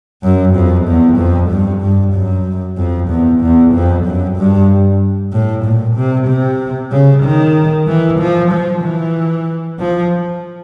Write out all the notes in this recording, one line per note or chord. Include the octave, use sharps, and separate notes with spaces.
F#2
F2
E2
F2
G2
G2
F#2
F2
E2
E2
F2
F#2
G2
A2
A#2
C3
C3
C#3
D#3
E3
F3
F3
E3
F3